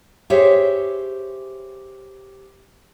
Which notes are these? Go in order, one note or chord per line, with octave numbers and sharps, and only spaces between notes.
G4 G#4 C5 C#5 E5